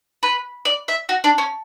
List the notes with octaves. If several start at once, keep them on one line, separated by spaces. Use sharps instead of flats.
B4
D5
E5
F#4
D4
C#4